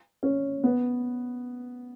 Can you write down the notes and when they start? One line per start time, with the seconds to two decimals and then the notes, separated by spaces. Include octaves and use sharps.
0.23 C#4
0.64 B3